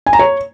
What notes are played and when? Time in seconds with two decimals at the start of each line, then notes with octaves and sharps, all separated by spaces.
0.06 G#5
0.13 A#5
0.19 C#5